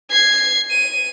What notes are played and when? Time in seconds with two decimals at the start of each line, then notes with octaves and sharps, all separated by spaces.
0.11 G#6 C7
0.70 D#7